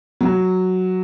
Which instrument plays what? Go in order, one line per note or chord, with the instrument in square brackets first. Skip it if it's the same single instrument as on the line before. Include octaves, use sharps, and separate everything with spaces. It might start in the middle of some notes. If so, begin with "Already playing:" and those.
[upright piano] F#3